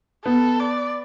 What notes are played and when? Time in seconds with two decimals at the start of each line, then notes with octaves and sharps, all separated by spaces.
0.25 B3 A4
0.60 D5